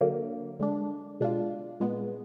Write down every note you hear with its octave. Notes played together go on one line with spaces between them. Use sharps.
D3 F#3 A#3
D3 G#3 D4
B2 G#3 D4 F4
A#2 G#3 B3